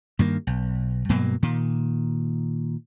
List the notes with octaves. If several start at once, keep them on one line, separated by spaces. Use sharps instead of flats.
G2 D#3 A#3
B1
G2 B2 F#3 A#3
A#2 D#3